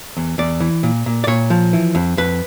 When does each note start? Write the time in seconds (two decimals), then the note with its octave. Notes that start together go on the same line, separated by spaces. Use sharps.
0.17 E2
0.38 E2 D5
0.60 E3
0.83 A#2
1.06 A#2
1.24 D5
1.27 A#2 C#5
1.50 F3
1.73 E3
1.95 F2
2.17 F2 B4